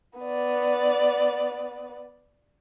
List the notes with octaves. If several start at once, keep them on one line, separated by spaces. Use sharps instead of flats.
B3 D5